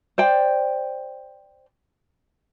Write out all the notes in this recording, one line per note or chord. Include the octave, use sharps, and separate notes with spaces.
C5 D5 G5